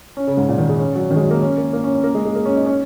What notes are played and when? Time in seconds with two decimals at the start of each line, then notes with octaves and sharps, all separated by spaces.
0.17 C#4
0.27 C#3
0.37 G#2
0.49 A#2
0.58 D#3
0.69 G#3
0.79 C#4
0.95 F#3
1.11 D#3
1.16 G#3
1.21 F#3
1.31 A#3
1.42 C#4
1.58 A#3
1.73 A#3
1.84 C#4
1.94 C#4
2.04 A#3
2.15 G#3
2.25 G#3
2.35 A#3
2.45 C#4
2.57 D#4
2.66 C#4